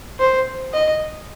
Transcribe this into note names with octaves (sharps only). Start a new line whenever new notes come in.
C5
D#5